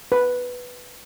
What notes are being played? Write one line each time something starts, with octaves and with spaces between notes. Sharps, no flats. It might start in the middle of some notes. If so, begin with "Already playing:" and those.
B4